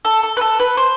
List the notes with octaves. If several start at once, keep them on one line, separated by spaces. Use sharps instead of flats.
A4
A4
B4
A4
B4
C5